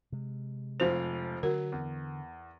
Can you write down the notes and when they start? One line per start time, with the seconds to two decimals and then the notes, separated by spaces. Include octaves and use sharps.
0.12 C3 G#3
0.80 F1 F3 C5 F7
1.43 D3 F#3 A#4
1.72 E2